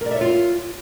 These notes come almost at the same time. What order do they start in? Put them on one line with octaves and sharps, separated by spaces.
A#4 D5 E5 C#5 F4